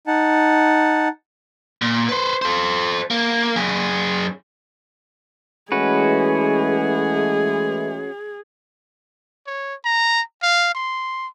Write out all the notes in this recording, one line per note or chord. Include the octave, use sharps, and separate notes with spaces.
D#4 F#5 A5
A#2
B4 C5
A4 C5
A#3
F#2 G#4
E3 G#3 A3 C#4 F#4 G#4 B4
C#5
A#5
F5
C6